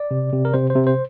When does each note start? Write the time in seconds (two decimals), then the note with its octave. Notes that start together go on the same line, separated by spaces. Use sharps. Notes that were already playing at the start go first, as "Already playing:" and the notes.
Already playing: D5
0.11 C3
0.33 C3
0.45 A#4
0.54 C3 C5
0.70 C5
0.76 C3
0.87 C5